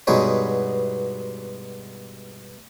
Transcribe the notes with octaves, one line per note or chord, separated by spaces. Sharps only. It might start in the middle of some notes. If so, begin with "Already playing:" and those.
G2 B2 G#3 B3 D#4 C#5